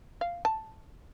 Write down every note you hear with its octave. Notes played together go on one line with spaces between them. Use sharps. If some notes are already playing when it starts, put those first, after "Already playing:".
F5
A5